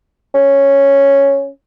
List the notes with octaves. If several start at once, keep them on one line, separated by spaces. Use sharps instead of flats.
C#4